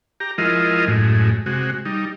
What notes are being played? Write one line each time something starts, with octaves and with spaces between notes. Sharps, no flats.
G4 A#5
F3 G#3 E4 F4 A#4 D#5
F#2 A2 G#3
C3 G#3 F#4
G3 D#4